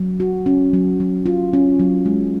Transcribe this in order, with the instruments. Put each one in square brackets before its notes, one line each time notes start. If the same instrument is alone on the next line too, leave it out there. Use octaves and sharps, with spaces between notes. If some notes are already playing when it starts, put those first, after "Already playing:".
Already playing: [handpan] F#3
F#4
C#4
F#3
F#3
F4
C#4
F#3
G#3